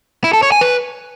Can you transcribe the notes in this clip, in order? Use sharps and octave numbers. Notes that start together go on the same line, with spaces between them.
E4
A4
C#5
G#5
B4